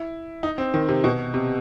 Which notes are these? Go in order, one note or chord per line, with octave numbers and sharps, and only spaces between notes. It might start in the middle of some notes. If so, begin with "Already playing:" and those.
Already playing: E4
D#4
C4
D#3
C3
B2
C3